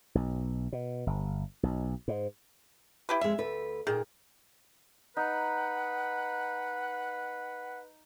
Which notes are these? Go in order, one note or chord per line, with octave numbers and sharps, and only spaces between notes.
B1
B2
G1
B1
G#2
E4 G4 B4
F2 G#3 E5
D2 A4 B4
A#2 D#3 G#4
D#4 B4 F#5